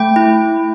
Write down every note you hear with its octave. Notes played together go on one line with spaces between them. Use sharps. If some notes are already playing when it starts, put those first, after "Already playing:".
Already playing: A3 G5
E4